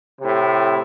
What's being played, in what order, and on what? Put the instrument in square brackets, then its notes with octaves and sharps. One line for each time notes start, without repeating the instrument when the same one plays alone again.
[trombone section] A2 C3